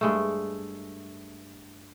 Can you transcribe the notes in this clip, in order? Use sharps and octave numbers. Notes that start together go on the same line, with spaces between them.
G2 G#3 A3